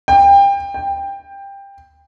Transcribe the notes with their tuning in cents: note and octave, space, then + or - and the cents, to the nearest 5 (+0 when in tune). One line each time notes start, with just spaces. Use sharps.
G5 +25
G5 +15